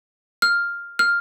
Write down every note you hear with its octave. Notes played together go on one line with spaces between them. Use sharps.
F6
F6